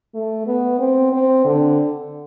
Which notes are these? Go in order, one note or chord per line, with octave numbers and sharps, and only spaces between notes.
A3
B3
C4
C4
D3